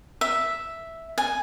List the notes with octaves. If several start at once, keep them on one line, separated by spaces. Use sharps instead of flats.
E5
G#5